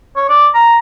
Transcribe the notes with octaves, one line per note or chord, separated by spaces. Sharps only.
C#5
D5
A#5